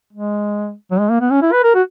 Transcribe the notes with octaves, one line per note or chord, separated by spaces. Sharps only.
G#3
F#3
G#3
A#3
B3
C#4
E4
B4
A#4
F#4